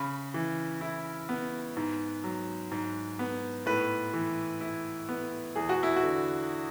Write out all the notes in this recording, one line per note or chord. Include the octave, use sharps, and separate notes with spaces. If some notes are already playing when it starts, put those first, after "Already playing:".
Already playing: C#3 B5
E3
E4
B3
G#2
F#3
G#2
B3
A2 B4
E3
E4
B3
E2 G#4
F#4
E4
F#4
D3